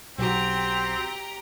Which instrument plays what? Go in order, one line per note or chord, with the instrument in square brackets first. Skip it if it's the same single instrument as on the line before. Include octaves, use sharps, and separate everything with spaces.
[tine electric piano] B1 F#4 [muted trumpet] C4 [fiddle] G4 A#5